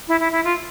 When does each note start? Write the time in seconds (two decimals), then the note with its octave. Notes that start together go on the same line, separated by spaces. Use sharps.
0.08 E4
0.20 E4
0.32 E4
0.44 F4